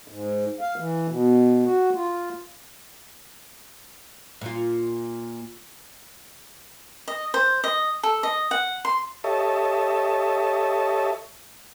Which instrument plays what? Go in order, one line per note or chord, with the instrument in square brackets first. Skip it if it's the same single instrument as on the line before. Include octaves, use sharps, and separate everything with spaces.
[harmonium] G#2
F5
E3
B2
F#4
F4
[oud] A#2 F4
[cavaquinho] D#5
C5
D#5
A4
D#5
F#5
C6
[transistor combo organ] G4 A4 C#5 D#5 E5 A5